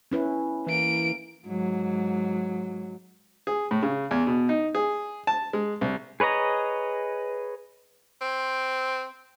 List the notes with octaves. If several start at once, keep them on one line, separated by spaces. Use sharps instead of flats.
C#4 E4 B4
E3 A#3 D7
G#2 F#3
G#4
A2
C#3
E2
B2
D#4
G#4
A5
G#3
C2
G#4 B4 C#5 D#5 A#5
C4